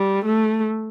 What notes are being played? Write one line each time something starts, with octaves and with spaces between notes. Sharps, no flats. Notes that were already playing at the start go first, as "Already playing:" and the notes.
Already playing: G3
A3